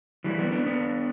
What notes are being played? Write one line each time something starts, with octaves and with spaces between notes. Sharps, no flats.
E3 G3
G3 B3
B3 D4
B3 D4